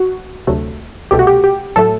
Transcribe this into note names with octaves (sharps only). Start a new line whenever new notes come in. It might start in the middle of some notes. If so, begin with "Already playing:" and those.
Already playing: F#4
D2 C3 F#3 A3
C2 B2 A3 G4
F#4
G4
G4
A2 F#3 A3 A4